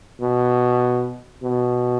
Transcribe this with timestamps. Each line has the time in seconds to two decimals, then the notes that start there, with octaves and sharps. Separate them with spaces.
0.21 B2
1.43 B2